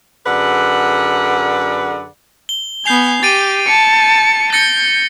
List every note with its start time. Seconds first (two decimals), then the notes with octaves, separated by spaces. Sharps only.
0.24 F#2 D3 G#4 B4 D5 F#5
2.49 G7
2.86 B3 G#5 G6 C7 F7
3.23 G4 A6 D7 D#7
3.67 A5 C#7
4.53 G6 A6 A#6 C#7